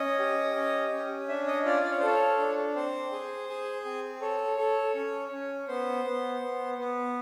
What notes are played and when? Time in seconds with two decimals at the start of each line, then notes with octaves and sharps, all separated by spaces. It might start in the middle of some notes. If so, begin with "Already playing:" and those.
Already playing: C#4 D#5
0.19 G4
0.56 C#4
0.92 C#4
1.28 D4 E5
1.47 D#5
1.65 F4 D5
1.83 D5
1.91 C#5
1.99 C5
2.02 A4 C#5
2.39 D4
2.75 C4 C5
3.12 G#4
3.49 G#4
3.85 C4
4.21 A4 C#5
4.58 A4
4.94 C#4
5.32 C#4
5.68 B3 C5
6.05 B3
6.41 B3
6.78 B3